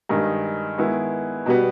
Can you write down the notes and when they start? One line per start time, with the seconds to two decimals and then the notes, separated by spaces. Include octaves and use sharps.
0.09 G2 D#3 G#3 D#4
0.78 D#3 G#3 B3 E4
1.46 B2 G3 B3